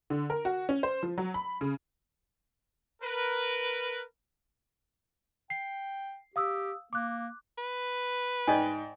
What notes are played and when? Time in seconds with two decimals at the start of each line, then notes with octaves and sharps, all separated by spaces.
0.10 D3
0.30 A#4
0.45 F#4
0.69 C#4
0.83 C5
1.03 F3
1.18 F#3
1.34 B5
1.61 C#3
3.01 A#4 B4
5.50 G5 C7
6.36 G4 F5 D#6 E6
6.93 A#3 D6 F#6
7.58 B4
8.48 G#2 D5 D#5 G5 G#5